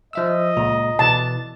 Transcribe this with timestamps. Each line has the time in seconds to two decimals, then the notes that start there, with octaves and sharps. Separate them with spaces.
0.13 F3 D#5 E5 E6
0.57 C#2 A#2 A#5
0.99 B2 E3 A5